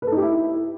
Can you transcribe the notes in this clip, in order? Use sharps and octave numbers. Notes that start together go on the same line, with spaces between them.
B4
A4
D#4
G4
E4